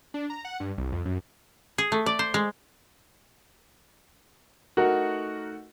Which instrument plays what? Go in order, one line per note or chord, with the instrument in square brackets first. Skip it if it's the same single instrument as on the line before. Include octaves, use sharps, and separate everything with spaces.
[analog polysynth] D4
A#5
F#5
G2
C2
F2
F#2
[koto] G#4
A3
D5
C5
G#3
[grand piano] A3 D#4 F#5 [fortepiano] F#4 A#4